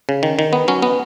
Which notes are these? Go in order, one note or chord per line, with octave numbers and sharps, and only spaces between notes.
C#3
D#3
D#3
B3
F#3 C#4
B3